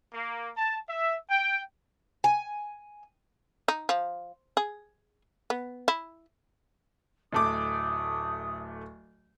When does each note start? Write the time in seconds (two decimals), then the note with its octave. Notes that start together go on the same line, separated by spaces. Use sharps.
0.14 A#3
0.57 A5
0.89 E5
1.30 G5
2.24 G#5
3.68 D#4
3.89 F3
4.57 G#4
5.50 B3
5.88 E4
7.33 D1 A3 D6 D#6